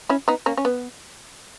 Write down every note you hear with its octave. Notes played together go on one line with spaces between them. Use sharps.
C#4 E4
B3 D#4
A#3 C#4
C#4
B3